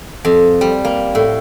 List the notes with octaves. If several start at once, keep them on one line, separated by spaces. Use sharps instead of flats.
F2
G3
A#3
A2